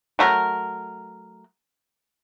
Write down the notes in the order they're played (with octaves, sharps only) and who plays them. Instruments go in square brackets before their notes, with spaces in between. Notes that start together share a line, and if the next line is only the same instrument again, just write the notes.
[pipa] F#3 A3 A#4